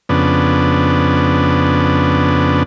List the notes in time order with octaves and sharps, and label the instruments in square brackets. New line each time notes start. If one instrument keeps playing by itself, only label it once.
[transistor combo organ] F2 C#3 B3 D4